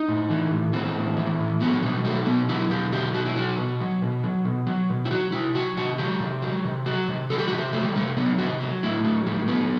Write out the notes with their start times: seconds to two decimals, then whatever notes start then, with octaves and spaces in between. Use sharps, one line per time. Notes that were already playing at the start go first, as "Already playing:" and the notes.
Already playing: D#4
0.08 A2
0.30 E3
0.51 A2
0.73 E3 C4
0.96 A2
1.17 E3
1.40 A2
1.60 F#3 B3
1.82 B2 G3
2.05 F#3 A3
2.26 B2 B3
2.49 F#3 E4
2.70 B2 G4
2.92 F#3 G4
3.14 B2 F#4
3.25 E4
3.35 F#3 F#4
3.58 B2
3.80 F#3
4.02 B2
4.24 F#3
4.45 B2
4.67 F#3
4.90 B2
5.05 E4
5.11 F#3 F#4
5.32 C3 E4
5.55 F#3 F#4
5.77 C3 F#4
5.98 F#3 G4
6.20 C3
6.42 F#3
6.65 C3
6.86 F#3 F#4
7.08 C3
7.30 F#3 A4
7.38 G4
7.48 C3 F#4
7.58 G4
7.73 F#3 A3
7.85 G3
7.95 C3 A3
8.16 F#3 B3
8.38 C3 F#4
8.60 F#3
8.83 A2 E4
9.04 F#3 A3
9.27 A2 G3
9.48 F#3 B3